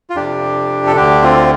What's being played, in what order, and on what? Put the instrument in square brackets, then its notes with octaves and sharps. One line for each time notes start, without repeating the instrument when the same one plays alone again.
[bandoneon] F4
F2 C3 D4 G4
A4
D2 D3 D4 G4
C4 F4